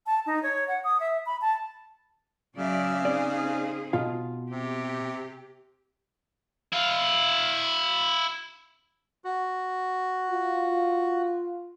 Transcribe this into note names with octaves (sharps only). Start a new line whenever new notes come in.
A5
D#4
C#5
F#5
D#6
E5
B5
A5
C#3 F#3 D5 E5
C4 D#4 G#4 D5
B2 F4 F5
C3 G4
E4 F5
F#4
F4